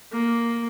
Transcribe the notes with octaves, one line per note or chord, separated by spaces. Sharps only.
A#3